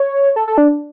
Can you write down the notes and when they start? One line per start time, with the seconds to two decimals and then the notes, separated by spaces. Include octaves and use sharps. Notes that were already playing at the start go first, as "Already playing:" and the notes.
Already playing: C#5
0.36 A4
0.48 A4
0.58 D4